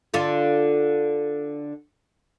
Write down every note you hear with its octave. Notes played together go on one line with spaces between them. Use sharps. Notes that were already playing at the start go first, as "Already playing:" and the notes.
D3 F4 A4